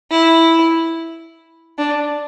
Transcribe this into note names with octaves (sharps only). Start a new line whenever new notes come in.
E4
D4